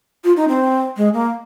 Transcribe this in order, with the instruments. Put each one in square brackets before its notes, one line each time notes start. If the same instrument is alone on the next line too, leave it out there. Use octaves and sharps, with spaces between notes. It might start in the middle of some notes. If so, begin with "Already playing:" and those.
[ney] F4
D#4
C4
G#3
A#3